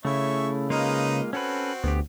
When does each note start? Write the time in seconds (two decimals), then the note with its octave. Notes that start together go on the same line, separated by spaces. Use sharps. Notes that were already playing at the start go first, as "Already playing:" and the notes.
0.05 C#3 A3 C#4 E4 E5 C#6
0.70 G#3 A#3 D#4 F4 B4 D#5
1.33 C4 C#4 F#4 A4 B4
1.84 D2 B3 G4